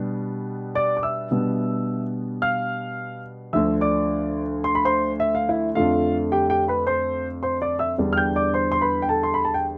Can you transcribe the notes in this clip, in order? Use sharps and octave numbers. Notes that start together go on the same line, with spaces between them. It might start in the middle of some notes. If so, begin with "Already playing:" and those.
Already playing: B2 G3 B3 D4
D5 D6
D6
E5 E6
B2 G3 B3 D4
F5 F6
D2 D3 F3 E5 E6
D5 D6
C6
B5
C5 C6
E5
F5
E4 E5
F2 D3 A3 D4 F4 F5
G4 G5
G4 G5
B4 B5
C5 C6
C5 C6
D5 D6
E5 E6
E2 D3 G3 D4
F6
G5 G6
D5 D6
C5 C6
C6
B4 B5
G5
A4 A5
C6
B5
A5
G5